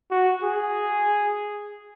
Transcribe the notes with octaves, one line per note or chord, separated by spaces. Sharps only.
F#4
G#4